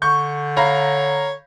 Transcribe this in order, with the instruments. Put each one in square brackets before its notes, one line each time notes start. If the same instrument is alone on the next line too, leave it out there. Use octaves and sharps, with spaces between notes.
[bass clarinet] D3 [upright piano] C#6 G6
[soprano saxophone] C#5 [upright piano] F5 A#5 B5